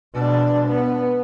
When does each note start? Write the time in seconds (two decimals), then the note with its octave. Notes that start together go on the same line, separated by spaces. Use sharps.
0.13 B2 D4
0.67 B3